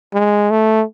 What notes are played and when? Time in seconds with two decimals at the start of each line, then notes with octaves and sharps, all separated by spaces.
0.13 G#3
0.51 A3